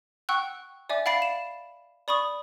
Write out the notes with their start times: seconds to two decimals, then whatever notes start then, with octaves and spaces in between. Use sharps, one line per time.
0.29 F#5 G5 C#6 E6 F#6
0.89 D5 E5 G#5 D6
1.06 F5 F#5 B5 A6 C7 D7
1.22 E7
2.08 D5 B5 C#6 D#6